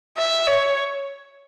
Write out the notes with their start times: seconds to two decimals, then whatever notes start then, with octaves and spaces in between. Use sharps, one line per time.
0.17 E5
0.47 C#5